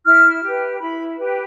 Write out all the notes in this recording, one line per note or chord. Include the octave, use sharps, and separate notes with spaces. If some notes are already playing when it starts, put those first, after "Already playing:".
E4 F6
G4 B4
E4 B5
G4 B4